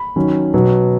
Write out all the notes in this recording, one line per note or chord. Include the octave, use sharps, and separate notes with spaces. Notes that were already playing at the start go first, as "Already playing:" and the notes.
Already playing: B5
D#3 F#3 C#4
B2 F#3 B3